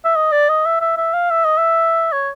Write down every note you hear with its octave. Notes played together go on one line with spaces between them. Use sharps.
E5
D#5
D5
D#5
E5
E5
E5
F5
E5
D#5
E5
C#5